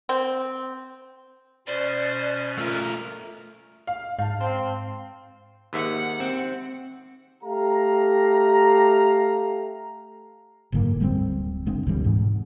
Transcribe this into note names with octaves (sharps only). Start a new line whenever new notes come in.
C4
B2 C#4 C5 D5
A3 F4 A#4
F5
G#2 F5 A5
C4
D#2 G#2 E5 F#5
C4
A3 G4 F5 A#5
F#1 G#2 D3 A#3
D1 G3 B3 C4
F#1 G#3 C4 D4
D2 B2 E3 G3
G#2